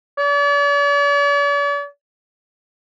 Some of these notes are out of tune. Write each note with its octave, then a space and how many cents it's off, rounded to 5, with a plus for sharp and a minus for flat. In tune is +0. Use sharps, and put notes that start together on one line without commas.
D5 -45